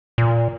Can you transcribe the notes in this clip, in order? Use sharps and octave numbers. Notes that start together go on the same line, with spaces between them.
A#2